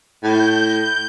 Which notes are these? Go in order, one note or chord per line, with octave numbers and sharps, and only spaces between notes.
A2 G6